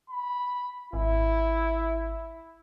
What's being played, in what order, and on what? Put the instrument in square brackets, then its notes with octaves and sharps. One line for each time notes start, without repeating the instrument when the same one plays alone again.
[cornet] B5
[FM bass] G#1 [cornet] E4